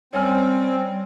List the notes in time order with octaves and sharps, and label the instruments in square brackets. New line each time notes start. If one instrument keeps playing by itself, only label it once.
[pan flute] G3 [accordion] C4 [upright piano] C#4 G#5 F6